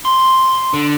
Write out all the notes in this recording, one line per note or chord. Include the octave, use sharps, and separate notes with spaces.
C6
D3